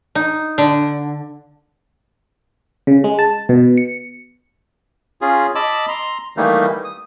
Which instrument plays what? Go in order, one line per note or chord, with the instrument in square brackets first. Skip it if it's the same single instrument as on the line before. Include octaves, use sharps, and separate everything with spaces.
[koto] D#4
D3
[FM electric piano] C#3
G#3
A5
B2
C#7
[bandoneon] C#4 F4 G#4
D#5 A5 B5 D6 E6
A#5 C6
D#3 E3 G3 A3 A#3 D#4
D#6